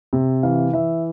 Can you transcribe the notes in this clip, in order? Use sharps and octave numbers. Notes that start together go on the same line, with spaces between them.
C3
E3 F5
E3 E5